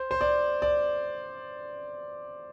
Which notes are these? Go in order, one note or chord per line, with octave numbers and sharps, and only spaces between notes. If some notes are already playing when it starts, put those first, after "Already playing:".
Already playing: C5
C5
D5
D5